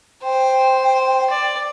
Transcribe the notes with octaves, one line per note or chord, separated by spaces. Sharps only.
C5 G5
D5